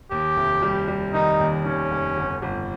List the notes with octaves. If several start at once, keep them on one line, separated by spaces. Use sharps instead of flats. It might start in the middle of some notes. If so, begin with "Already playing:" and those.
D#2 G4
F1
G3
G3
D#3 D#4
D#2
D#3 C#4
F1
G1
G1